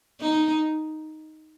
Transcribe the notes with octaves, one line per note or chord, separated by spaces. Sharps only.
D#4